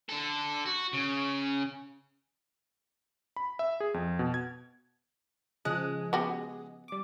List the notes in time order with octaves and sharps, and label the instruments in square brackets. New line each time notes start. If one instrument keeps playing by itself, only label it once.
[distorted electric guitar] D3 A4
F#4
C#3
[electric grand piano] B5
E5
G#4
F2
B2
G#6
[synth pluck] C#3 F3 F#6 [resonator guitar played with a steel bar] G#3
[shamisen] B3 F#4 G4
[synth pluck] G3 D6